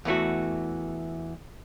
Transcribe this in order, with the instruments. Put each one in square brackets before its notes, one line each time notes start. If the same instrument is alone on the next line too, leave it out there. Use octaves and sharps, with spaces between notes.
[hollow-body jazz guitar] E2 E3 A3 F#4